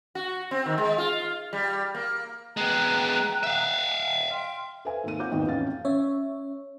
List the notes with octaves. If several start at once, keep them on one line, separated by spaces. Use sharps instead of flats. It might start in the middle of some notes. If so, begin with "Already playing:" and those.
F#4
C4
D#3
G#3
F4
G3
A#3
G#3 B3 G5 A#5 F#6
E5 F5
G5 C6 F6
A4 B4 C5 E5 F5 G#5
G#2 D#3 A#3 D#7
C4 F4 C#5 F#5 D6 G6
G#1 E2 G#2 A#3 D#5 G5
A1 F2 E3 C#4 F5 A6
C#4 C#5 E5